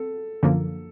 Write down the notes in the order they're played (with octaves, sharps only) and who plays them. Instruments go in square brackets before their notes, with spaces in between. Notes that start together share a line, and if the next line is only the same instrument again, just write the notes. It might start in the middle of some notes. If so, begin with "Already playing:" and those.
Already playing: [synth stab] C4 [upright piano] A4
[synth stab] F#2 D3 F3 A#3